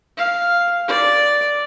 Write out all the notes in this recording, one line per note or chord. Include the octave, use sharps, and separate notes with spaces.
F5
D5